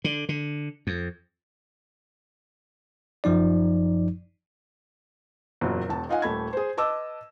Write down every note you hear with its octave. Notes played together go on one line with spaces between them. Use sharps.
D3
D3
F2
G1 F#2 F3 D#4 D5
F#1 E2 A#2 F#3
E1 E2 A5
D#4 F4 D#5 F5 F#5 G#5
D#1 A3 B5 G#6
G#4 C5
B4 D#5 A5 D6 E6